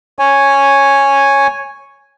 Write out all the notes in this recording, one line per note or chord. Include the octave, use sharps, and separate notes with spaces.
C#5 G#5